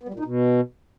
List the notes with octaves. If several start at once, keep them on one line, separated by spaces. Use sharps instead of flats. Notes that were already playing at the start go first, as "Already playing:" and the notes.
B3
G3
A#2
D#4
B2